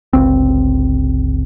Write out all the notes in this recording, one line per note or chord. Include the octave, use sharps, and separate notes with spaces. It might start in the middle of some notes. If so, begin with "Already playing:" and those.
G1 C#2 C4